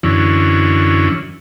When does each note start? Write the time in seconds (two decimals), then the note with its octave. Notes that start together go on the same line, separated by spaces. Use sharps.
0.03 F#2 D3 E3 C#4